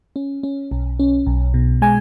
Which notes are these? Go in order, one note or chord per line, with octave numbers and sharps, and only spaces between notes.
C#4
C#4
B1
C#4
B1
B2
G#3 G#5